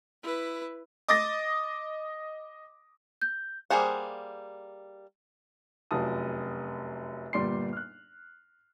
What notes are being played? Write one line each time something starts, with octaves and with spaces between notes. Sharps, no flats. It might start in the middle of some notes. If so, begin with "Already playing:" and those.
E4 B4
D#5 D6 D#6 A6 A#6
G6
G3 A#3 G#4 C5 F#5
F1 F#2 F4 A5 D#6
G1 A#2 G3 D5 C6 C7
F6 F#6